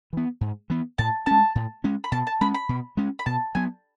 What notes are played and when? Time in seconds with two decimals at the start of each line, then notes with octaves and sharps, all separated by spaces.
0.13 E3 B3
0.41 G#2
0.70 E3 B3
0.98 A2 A5
1.26 G#3 C#4 A5
1.55 A2
1.84 G#3 C#4
2.04 B5
2.12 B2 A5
2.27 A5
2.41 G#3 C#4 B5
2.54 B5
2.69 B2
2.97 G#3 C#4
3.19 B5
3.26 B2 A5
3.55 F#3 B3 G#5